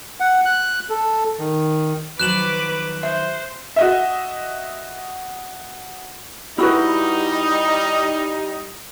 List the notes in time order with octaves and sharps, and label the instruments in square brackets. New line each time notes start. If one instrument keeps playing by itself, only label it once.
[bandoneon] F#5
F#6
A4
D#3
[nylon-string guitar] D#3 F3 F#3 [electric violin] B4 D6 [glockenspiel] F#6 E7 F#7
[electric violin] C5 [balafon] E5
[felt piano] F#4 D#5 E5
[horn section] G3 D#4 [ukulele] E4 F#4 B4